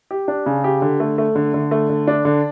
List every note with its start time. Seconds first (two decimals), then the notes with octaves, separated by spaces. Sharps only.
0.11 G4
0.28 D4
0.46 C#3
0.64 G4
0.82 D3
1.00 A3
1.18 A3
1.36 D3
1.54 D3
1.71 A3
1.89 D3
2.07 D4
2.25 D3